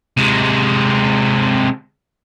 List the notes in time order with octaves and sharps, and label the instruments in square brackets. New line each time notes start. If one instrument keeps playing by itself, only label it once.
[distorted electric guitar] C3 G#3